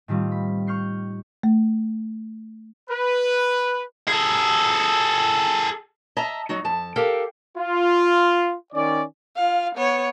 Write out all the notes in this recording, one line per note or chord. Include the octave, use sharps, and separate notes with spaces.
A2 D#3 G3 C4 F4
B5
C#6 F6 G6 C7 C#7
A3
B4
G#4 A4
D#5 E5 A5 A#5
F#3 D#4 F#4
F2 A5
G4 A4 A#4 F5 G5
F4
D#3 C#4 D5
F4 F5
B3 C#5